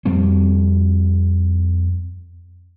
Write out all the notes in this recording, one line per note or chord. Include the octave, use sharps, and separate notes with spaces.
F2 G3 C4